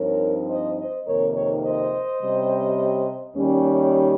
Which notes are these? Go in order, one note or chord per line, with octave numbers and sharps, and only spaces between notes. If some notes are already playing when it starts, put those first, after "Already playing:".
Already playing: G2 F3 C4 D#4 A#4 C#5
C5 D#5
C5 D#5
F2 C3 D#3 A#3 D#4 A#4 C#5
A#4 C#5
C5 D#5
C3 G3 C#4
D#2 D#3 G3 C#4